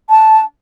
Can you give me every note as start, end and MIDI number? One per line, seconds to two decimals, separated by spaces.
0.09 0.40 81